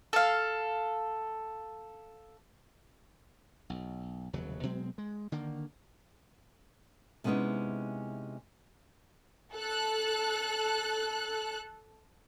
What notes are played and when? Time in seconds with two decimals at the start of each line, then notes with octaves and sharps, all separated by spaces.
0.13 A4 F5
3.70 B1
4.33 F1 D#2 C#3 F#3
4.63 B2 F#3 G#3 C4
4.98 G#3
5.32 D3 D#3 A#3
7.24 C3 G#3 B3 C#4 D#4 E4
9.54 A4 F#6